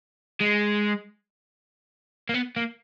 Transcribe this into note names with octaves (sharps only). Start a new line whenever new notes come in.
G#3
A#3
B3
A#3